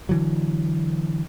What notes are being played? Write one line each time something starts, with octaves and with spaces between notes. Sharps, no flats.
D3 E3 F#3